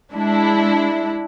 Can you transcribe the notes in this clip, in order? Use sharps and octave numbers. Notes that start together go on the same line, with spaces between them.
G#3 D4 E4